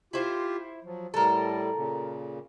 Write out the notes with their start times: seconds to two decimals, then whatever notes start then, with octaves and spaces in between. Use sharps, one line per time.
0.13 E4 F4 G4 C5
0.84 F3 F#3
1.14 A2 G3 A4 A#4
1.75 A#2 C#3